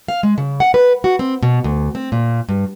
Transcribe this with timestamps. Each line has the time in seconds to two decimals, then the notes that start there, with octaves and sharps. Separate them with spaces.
0.08 F5
0.23 G#3
0.38 C#3
0.60 F#5
0.74 B4
1.04 F#4
1.19 C4
1.43 B2
1.64 D2
1.95 C4
2.12 A#2
2.49 G2